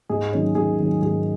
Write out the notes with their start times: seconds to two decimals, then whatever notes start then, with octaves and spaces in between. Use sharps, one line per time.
0.09 G#2 G#4
0.32 D#3 F#3 A#3 C#4
0.55 G#2 G#4
0.79 D#3 F#3 A#3 C#4
1.01 G#2 G#4